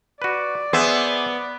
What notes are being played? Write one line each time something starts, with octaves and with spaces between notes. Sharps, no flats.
F#4 B4 D5
B3 G#4 C5 E5